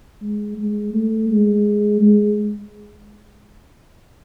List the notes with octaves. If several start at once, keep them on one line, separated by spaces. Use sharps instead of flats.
G#3
G#3
A3
G#3
G#3